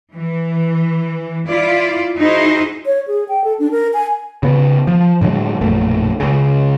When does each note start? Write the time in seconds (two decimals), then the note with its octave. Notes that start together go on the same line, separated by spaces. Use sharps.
0.12 E3
1.45 E4 F4 D5
2.18 D#4 E4 F#4 G#4 C5 D#5
2.86 C#5
3.08 G#4
3.29 G5
3.44 A4
3.59 D4
3.71 A#4
3.94 G#5
4.43 C#3 B3
4.87 F3
5.21 A2 D3 F#3 G#3
5.61 A#1 F#2 B2 A3
6.20 C#2 C#3